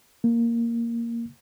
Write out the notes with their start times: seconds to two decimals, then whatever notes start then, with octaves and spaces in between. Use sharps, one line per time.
0.24 A#3